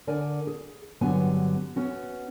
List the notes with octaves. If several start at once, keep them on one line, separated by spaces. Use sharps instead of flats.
D3 A#4 D5 G#5
G#4
G2 D3 F#3 B3 G#5
B3 C#4 F#4